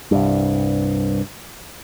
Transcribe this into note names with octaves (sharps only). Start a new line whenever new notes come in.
C2 G2